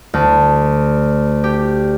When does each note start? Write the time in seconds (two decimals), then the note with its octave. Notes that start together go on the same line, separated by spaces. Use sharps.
0.14 D2
1.44 G4